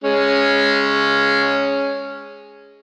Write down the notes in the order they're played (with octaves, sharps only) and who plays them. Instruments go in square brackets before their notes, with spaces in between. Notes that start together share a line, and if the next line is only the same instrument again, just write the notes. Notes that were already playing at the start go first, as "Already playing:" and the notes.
[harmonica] G#3 C#4